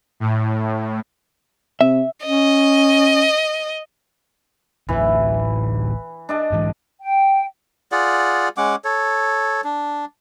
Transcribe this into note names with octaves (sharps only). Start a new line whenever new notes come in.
A2
C3 E5
C#4 D#5
D1 A1 A2 E3
D4 D#5 A5
G#2 E3 G#3
G5
F4 G#4 D5 F#5
G#3 C#4 F#5 D6
A4 C#5
D4